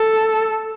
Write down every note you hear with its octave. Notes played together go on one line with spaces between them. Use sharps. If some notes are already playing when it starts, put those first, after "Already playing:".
Already playing: A4